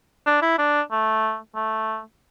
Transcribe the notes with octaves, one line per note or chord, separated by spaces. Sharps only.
D4
E4
D4
A3
A3